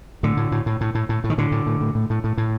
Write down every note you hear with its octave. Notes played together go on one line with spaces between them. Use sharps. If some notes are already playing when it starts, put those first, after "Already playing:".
A2 D3
A2
A2
A2
A2
A2
A2
A2
D#3
A2 D3
A2
A2
A2
A2
A2
A2
A2